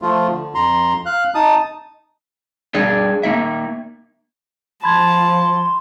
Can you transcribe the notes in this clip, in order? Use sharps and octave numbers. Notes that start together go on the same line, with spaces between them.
F3 A3 F4
D3
F2 A#5 C6
F5 F#6
D#4 A5 D#6
G3 D4 G#4 D5
A#3 D#4 E5
F3 A5 B5 C6 G#6